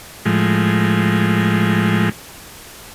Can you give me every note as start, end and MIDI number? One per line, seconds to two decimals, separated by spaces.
0.25 2.09 45
0.25 2.09 53
0.25 2.09 56